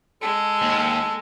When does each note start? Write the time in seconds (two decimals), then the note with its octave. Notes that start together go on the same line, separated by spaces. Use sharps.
0.22 G#3 A4
0.62 D#2